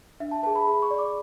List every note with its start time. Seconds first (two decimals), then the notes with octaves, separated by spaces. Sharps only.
0.20 D4 E5
0.31 A5
0.43 G#4 B4 A5
0.55 B5
0.67 G#4 B5
0.82 C#6
0.90 D5
0.98 D6